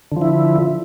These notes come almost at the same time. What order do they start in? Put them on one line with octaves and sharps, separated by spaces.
D3 F3 E4